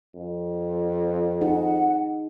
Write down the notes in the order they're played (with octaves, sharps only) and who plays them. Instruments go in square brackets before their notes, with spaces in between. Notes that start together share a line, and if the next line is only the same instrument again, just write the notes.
[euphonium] F2
[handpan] D#4 G#4 [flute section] F#5